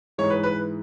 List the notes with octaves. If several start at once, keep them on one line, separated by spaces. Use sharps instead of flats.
G#2 E3 G#3 C#5
B4
B4